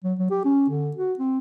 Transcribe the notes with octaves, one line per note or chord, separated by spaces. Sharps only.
F#3
F#3
G4
C#4
D3
F#4
C4